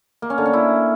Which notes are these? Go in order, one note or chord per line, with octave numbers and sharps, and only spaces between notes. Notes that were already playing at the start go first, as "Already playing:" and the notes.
A#3
C#4
D3
C#4
E4